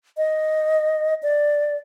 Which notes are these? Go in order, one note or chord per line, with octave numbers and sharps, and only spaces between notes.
D#5
D5